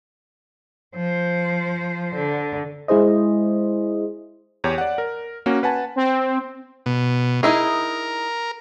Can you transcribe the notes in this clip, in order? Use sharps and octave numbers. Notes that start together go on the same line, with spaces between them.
F3 C5
D3
G#3 E4 G#4 C5 D#5
E2 G4 C#5
D5 F#5
A#4
A#3 C#4 F#4
B4 F#5 G#5 A5
C4
B2
D#4 E4 G#4 A#4